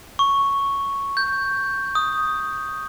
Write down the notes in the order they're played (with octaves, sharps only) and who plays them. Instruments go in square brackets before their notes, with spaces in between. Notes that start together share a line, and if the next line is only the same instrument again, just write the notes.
[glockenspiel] C#6
G6
D#6